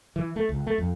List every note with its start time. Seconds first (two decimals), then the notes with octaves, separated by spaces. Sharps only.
0.16 E3
0.36 A3
0.49 C#2
0.67 A3
0.78 F2